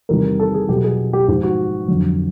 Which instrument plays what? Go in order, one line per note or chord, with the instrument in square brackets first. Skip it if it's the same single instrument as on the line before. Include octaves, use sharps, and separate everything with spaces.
[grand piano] E2 C3 D#3 G3 A#4
A4
G#4
B2 F#3 G4
G#4
G4
G#2 F3 G4
F#4
F2 D3 F#3